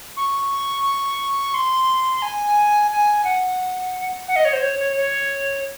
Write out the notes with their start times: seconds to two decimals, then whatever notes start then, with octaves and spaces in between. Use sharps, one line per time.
0.17 C#6
1.54 C6
2.22 G#5
2.91 G#5
3.24 F#5
4.28 F#5
4.36 D#5
4.45 C#5
4.53 C5
4.62 C#5
4.79 C#5
4.97 C#5